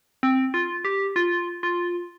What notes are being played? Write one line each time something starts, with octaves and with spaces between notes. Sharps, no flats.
C4
F4
G4
F4
F4